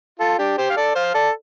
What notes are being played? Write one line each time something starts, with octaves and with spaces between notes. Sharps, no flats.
F4 A4
D4 G4
G4 C5
F5
A4 D5
C5 F5
A4 D5